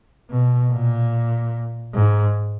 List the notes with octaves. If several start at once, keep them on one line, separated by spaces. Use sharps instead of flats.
B2
A#2
G#2